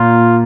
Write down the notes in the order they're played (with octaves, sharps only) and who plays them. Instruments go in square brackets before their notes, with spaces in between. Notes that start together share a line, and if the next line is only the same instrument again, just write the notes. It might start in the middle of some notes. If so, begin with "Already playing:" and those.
Already playing: [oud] A#2 [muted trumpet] F4